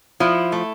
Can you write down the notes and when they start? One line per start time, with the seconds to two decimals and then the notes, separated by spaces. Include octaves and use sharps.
0.20 F3 E4
0.52 A3